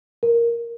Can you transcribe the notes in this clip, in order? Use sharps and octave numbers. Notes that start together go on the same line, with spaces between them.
A#4